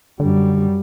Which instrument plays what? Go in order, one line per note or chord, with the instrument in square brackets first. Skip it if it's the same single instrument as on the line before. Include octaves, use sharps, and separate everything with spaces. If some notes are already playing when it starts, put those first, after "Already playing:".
[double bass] F#2 G3 [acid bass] D3